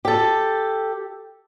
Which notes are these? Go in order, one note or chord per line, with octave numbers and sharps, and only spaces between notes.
G4 A4